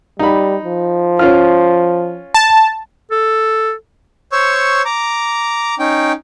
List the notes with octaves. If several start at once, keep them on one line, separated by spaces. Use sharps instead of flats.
G3 D#4 B5
F3
C#4 F4 F6
A5
A4
C5 C#5 C#6 E6
A#5 D6
C#4 D#4 G5